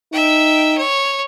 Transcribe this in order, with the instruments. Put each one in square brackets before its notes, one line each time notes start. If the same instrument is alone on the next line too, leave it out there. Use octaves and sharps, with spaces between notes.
[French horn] D#4 [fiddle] E5 G5
[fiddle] C#5